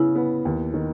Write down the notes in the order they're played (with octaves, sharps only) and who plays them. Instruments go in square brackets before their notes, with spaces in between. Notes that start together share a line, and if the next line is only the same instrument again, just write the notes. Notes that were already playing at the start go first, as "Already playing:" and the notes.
Already playing: [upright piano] C#3 B3 [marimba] E4
[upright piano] B3
D#2
D#3